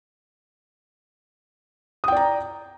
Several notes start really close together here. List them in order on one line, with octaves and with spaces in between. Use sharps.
D#6 G5 D5 A#5